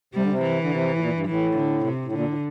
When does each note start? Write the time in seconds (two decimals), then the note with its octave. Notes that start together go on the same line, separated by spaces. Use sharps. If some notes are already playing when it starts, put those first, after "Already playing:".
0.14 C3 G3
0.22 D3
0.29 C3
0.43 E3
0.61 D3
0.71 C3
0.95 A2
1.00 A#2
1.14 G2
1.28 A2 E3
1.57 D3
1.86 C3
2.04 A2
2.14 A#2 D3
2.29 A2